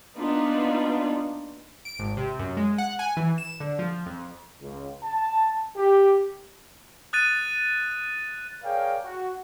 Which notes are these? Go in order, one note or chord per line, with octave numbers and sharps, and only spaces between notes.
A#3 B3 D4 D#4 F4 B4
D7
G#1
C3
F#2
G#3
F#5
G#5
E3
E7
D3
F3
F2
C#2
A5
G4
D#6 F#6 A6 D#7
G#4 A#4 C#5 D5 F5 G5
F#4